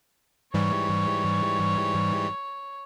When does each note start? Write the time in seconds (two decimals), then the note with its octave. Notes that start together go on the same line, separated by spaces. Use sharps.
0.54 G#2 E3 G3 C#5